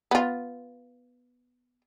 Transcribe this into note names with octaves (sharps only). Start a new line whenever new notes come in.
B3 F4